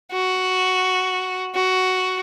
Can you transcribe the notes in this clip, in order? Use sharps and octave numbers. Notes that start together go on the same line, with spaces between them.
F#4
F#4